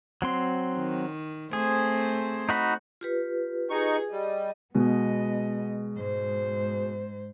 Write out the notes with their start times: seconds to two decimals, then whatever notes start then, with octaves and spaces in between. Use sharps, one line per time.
0.22 F#3 C4 C6
0.76 D#3
1.53 A3 C4 G#4 C5
2.49 D#4 F#4 B5
3.01 F4 G4 B4
3.70 D#4 G#4 C#6
4.11 G3 D#5
4.75 B2 G#3 B3 D#5
5.96 G#2 C5